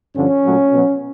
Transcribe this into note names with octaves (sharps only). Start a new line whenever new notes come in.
G2 D3 F3 C#4
A#2 F#3 A3
B2 F#3 B3